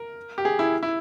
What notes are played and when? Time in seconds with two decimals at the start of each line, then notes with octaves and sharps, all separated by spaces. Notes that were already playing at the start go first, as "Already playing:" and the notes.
Already playing: A#4
0.38 G4
0.45 G#4
0.59 E4
0.83 E4